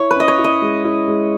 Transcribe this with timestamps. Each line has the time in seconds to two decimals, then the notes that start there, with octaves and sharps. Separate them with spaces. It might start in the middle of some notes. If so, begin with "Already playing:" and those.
Already playing: E4 C#5
0.11 B4
0.16 C#4 D#5
0.28 C#5
0.38 E4
0.44 D#5
0.62 G#3
0.84 E4
1.08 G#3